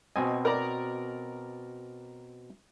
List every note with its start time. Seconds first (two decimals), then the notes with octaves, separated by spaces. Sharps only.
0.16 B2 C4 D#5 G#5
0.45 A#4 D5 A#5